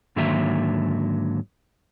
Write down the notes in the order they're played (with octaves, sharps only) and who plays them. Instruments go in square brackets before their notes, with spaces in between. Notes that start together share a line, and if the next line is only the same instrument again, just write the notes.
[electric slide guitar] G#2 D3 D#3 F#3 A#3 E5